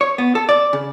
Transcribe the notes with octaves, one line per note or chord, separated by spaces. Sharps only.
C#5
B3
A4
D5
C#3